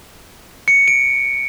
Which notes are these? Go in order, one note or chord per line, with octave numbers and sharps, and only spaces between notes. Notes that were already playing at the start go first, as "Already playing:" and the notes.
C#7
D7